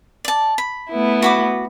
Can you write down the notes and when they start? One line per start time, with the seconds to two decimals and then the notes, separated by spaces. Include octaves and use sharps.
0.25 D5 A5
0.58 B5
0.91 A3 B3 E4
1.22 F#4 B5 D6